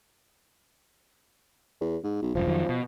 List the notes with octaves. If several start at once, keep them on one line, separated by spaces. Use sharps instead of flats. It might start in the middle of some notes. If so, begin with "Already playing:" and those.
E2
G#2
B1
E1 F#2 F3
F2 D#3 F#3
B2